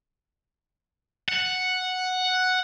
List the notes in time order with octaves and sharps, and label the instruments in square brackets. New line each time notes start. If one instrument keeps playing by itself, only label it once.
[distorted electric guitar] F#5